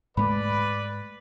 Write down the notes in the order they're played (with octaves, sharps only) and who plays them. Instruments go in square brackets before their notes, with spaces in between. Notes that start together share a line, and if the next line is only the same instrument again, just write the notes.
[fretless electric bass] G#2 G#3 A3 [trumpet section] B4 D5 [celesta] B5